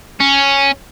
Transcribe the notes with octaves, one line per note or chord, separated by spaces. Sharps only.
C#4